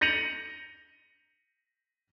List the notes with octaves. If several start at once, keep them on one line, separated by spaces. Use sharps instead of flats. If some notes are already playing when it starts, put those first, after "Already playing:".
G6 A#6 C#7 D#7 F7 F#7